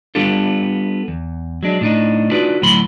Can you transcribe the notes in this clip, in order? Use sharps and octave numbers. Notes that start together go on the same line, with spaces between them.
G3 B3 D4 F4 G4 A4
E2
F#3 G#3 D4
A2 D4 D#4
D4 D#4 F4 F#4 B4 D5
D2 A2 F#3 B5 C6